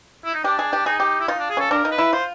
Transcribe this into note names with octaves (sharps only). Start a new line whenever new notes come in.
E4
D#4
D4 G4
G#4
G4
D#4 G#4
G4
E4
D#4 F4
D4
G#4
C#4 A4
D4 A#4
D#4
B4
E4
F4 C5